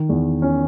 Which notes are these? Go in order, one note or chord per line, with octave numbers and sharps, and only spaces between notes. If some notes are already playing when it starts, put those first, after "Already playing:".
Already playing: D#3
E2
C#4